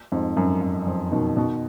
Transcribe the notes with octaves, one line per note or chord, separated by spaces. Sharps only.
F2 G#2
F#2
F#2
F2
B2 D#3
B2 D#3